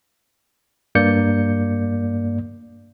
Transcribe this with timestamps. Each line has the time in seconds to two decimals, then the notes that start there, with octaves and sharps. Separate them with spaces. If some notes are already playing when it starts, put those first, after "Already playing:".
0.95 G2 A#3 D5 G6 C#7